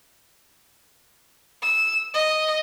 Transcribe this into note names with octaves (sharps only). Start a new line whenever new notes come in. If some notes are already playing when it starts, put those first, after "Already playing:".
E6
D#5